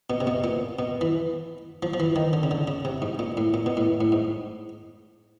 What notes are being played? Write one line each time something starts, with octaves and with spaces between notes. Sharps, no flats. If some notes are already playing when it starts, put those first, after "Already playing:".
B2
C3
B2
A#2
B2
E3
F3
F3
E3
D#3
D3
C#3
D3
C#3
C3
G#2
A#2
A2
A#2
B2
A2
A2
G#2